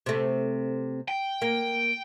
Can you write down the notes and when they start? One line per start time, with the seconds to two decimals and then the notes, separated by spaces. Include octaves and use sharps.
0.06 C3 A3
1.08 G5
1.42 A#3